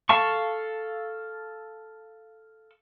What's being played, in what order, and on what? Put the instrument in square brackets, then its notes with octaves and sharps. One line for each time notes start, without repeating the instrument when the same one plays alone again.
[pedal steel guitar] A4 F5 A5 C#6